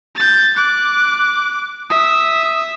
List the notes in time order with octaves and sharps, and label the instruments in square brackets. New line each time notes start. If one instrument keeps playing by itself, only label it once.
[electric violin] G6 A6
[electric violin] D6 [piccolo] F#6
[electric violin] E5 [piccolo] D#6